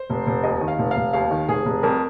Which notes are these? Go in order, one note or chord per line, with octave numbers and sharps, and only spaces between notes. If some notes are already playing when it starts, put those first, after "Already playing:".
Already playing: C5
F1
F1
D#2 D#5
D#3
F5
F1
F5
F1
D#2 F5
D#3
F1 G#4
F1
F2 A#4